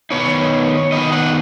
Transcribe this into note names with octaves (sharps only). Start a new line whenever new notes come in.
D#3 B3 D#4 C#5
D#3 B3 D#4 D#5
F#5